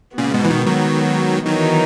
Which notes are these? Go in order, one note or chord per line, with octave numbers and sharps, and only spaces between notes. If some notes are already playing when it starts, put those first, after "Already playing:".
A#2 C#3 G#3 B3 F#4
G#2 B2
E3
B2 D#3
D#3 F#3
D#3 E3 F#3 B3 D#4 A#4